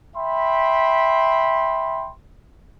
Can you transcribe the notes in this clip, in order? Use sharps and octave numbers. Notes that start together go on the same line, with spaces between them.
E5 G5 B5 C6